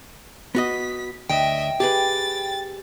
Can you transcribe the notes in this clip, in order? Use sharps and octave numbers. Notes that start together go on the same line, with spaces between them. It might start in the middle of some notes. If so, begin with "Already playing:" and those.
B3 F#4 D#5 B6
D2 D#5 E5 G5
G4 G#4 B4 A6